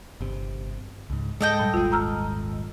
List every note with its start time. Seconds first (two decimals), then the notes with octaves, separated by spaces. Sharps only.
0.21 G1 C3
1.10 C#2 G#2
1.41 G#2 G#3 A4 D#5 G5
1.59 A#2 G3
1.74 D#1 G#1 G#3 F4
1.92 A#5 E6 F6